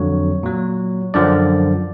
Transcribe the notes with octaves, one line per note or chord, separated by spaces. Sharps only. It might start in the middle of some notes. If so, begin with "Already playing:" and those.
Already playing: F2 D3 F#3 C#5
A#2 F#3
F#2 D3 F3 D5